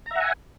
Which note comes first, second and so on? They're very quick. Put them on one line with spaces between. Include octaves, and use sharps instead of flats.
A#5 E5 F#5 G#5